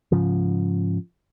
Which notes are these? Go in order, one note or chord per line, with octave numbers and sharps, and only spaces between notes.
G#2 C#3 F3